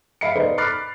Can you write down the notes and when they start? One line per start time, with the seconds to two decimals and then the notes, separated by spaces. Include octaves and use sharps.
0.21 E5 F5 B5 C7 C#7
0.35 D#4 A4 B4 C5 D5 D#5
0.58 B5 D6 F6 F#6 A6 C7